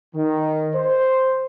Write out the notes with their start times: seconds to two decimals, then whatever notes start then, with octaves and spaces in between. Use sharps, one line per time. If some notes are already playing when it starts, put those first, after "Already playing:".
0.15 D#3
0.75 C5